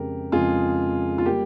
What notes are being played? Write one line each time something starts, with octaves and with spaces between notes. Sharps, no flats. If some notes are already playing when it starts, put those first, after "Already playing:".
Already playing: F2 C#3 G#3 G4 A#4
F2 C#3 G#3 F4 G#4
F4
G3 A#3 G4